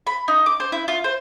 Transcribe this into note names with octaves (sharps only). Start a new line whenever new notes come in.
B5
D#4
D6
C5
E4
F4
C5